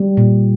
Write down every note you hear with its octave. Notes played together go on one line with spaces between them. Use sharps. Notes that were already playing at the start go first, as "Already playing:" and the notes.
Already playing: G3
A#2